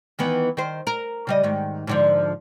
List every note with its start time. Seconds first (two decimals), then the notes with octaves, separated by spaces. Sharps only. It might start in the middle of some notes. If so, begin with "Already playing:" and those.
0.19 D#3 E3 B3
0.57 D#3 C5
0.87 A#4
1.27 C#3 G3 D#5
1.43 G#2 D#3
1.87 G#2 D3 F3